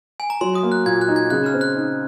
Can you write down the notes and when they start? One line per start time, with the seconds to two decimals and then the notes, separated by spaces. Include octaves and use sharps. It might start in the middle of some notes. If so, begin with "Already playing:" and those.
0.20 G#5
0.30 A#5
0.41 F#3 C6
0.55 D#6
0.63 A#3
0.72 F#6
0.86 A#2 G#6
1.01 F#6
1.08 D#4
1.16 G#6
1.30 C#3 F#6
1.46 F6
1.54 C4
1.61 F#6
1.76 D#4